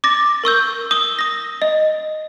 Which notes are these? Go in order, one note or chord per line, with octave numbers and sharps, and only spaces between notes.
D6 A6 A#6
A#4 C#6 E6 G6
D#6 E6 G7
D#6 A#6
D#5